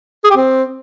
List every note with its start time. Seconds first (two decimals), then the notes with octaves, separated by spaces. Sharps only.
0.24 G#4
0.30 G4
0.37 C4